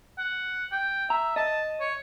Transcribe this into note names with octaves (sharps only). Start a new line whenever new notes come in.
F#5
G5
E5 A#5
D#5 A5
C#5